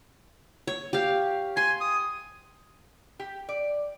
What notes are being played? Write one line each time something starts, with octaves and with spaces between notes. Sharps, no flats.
C#5
G4 F5
G#5 C6
D#6
G4
D5